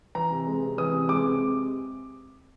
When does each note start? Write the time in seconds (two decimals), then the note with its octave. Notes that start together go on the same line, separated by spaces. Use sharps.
0.15 E3 A#5
0.31 C3
0.47 G#3
0.62 C3
0.78 E3 D#6
0.93 C3
1.09 G#3 D6
1.25 C3